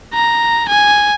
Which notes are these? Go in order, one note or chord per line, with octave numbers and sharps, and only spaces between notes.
A#5
G#5